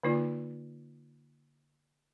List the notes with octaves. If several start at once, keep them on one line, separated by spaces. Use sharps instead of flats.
D3 A#3 D#4 F4 D5